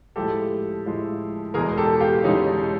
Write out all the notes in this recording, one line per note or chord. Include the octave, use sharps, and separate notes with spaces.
A2 F3 G#3 G4 A4
A2 F3 G#3
E2 B2 G#3 G#4 A#4
G4 A4
F4 G4
E2 B2 G#3 C#4 D#4